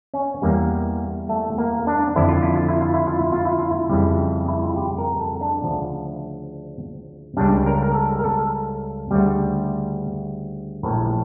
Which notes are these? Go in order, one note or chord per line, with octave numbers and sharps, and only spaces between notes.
C#4
E2 E3 G3 A#3
A3
A#3
D4
F2 D3 F3 E4
F4
E4
F4
E4
F4
E4
F4
E4
F4
E4
F4
E4
F2 C#3 E3 G3
E4
F4
G4
A#4
A4
D4
D2 C#3 F3
C#2 C#3 G3 D4
A#4
A#4
A4
A#4
A4
D2 C#3 G3
A#1 A2 F3 A#4